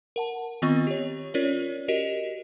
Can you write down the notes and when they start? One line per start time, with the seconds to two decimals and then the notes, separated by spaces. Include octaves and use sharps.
0.16 A#4 F#5 A5
0.62 D#3 B3 C4 F4 D#5 C#6
0.87 G4 C#5
1.34 C#4 F4 A#4 C#5 D5
1.88 F#4 G4 A#4 D#5